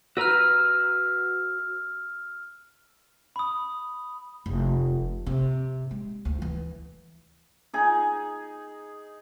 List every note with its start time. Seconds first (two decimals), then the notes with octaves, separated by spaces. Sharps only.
0.17 F#4 B4 A#5 E6 F6
3.36 B5 D#6
4.46 F1
5.26 C3
5.91 G#3
6.25 D2
6.42 E3
7.74 D#4 G#4